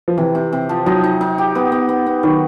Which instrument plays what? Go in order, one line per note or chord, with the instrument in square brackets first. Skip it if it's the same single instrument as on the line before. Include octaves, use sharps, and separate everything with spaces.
[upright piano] F3
[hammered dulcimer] C3 [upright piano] E3
[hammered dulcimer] C3
C3
F3
[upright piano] F#3 [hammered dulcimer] D#4
[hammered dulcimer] D#4
D#4
G4
B3
B3
B3
B3
[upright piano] D#3 [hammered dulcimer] F#3